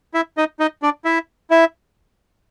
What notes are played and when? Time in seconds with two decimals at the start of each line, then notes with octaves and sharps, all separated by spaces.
0.14 E4 E5
0.38 D#4 D#5
0.60 D#4 D#5
0.83 D4 D5
1.05 E4 E5
1.51 E4 E5